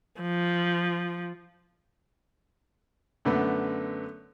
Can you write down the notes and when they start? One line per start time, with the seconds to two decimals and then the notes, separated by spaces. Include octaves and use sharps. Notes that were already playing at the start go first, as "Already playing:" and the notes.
0.22 F3
3.25 F#2 D3 A3 B3